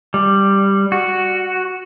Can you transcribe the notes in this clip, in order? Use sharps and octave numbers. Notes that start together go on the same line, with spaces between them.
G3
F#4